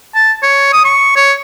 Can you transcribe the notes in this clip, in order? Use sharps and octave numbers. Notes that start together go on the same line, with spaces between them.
A5
C#5
D#6
C#6
C#5